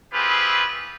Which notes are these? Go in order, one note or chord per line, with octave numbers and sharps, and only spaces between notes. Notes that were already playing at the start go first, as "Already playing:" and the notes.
C4 E4 F4 G4 G#4 B4